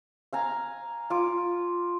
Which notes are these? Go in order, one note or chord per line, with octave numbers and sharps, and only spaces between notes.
F5 G#5 A#5
F4 D6